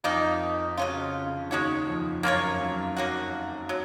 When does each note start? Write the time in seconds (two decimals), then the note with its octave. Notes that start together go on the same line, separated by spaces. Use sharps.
0.04 F2 D#3 F3 A#3 D#4
0.77 C#3 F#3 C#4 F4
1.26 C#3
1.50 D#2 D#3 G#3 C#4 F#4 C#5
1.87 F2 F3
2.23 F#2 F#3 A#3 F4 A#4 C#5
2.60 F#2 F#3
2.96 A#3 C#4 F#4
3.69 F#3